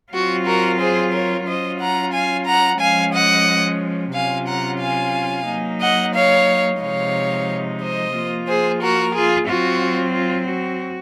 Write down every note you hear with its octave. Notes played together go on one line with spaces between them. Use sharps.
F#3 C4 F4 F#4
F#4 A#4
G#4 C5
A#4 C#5
F#3 C#4 F4 C5 D#5
F#5 A#5
F5 G#5
F#5 A#5
F3 G#3 C#4 F5 G#5
D#5 F#5
C3 F#3 C#4 F4 F5 G#5
F#5 A#5
F5 G#5
F#3 A#3 D#4
D#5 F#5
C#5 F5
C3 F3 G#3 D#4 C#5 F5
C5 D#5
F3 A#3 F4
G#4 C5
F#4 A#4
F4 G#4
F#3 C4 F4 F#4
F4
F#4